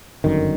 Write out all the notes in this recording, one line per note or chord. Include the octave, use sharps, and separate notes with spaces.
G1 F#2 D3 D#3